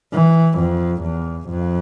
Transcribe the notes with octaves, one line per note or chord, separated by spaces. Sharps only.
E3
F2
E2
F2